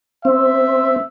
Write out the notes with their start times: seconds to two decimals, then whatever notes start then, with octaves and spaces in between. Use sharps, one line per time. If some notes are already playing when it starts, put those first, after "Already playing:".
0.25 C4 E5